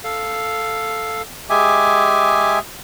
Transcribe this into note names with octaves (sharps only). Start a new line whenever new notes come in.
A4 F5
G#3 G4 G#4 E5 G#5 D6